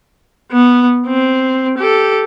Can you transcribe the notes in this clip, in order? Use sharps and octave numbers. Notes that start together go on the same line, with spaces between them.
B3
C4
G4 A4